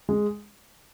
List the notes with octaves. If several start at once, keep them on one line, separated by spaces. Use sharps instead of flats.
G#3